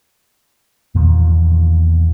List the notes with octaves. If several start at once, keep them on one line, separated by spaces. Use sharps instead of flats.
E2 A#2 D#3 F3